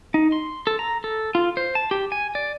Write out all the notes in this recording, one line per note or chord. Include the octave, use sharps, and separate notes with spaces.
D#4
C6
A4
A#5
A4
F4
C5
A5
G4
G#5
D5